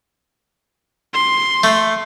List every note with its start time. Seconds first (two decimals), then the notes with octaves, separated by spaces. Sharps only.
1.14 C6
1.64 A3